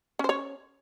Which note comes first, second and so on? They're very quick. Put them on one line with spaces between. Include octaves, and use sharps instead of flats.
C#4 C5 C#5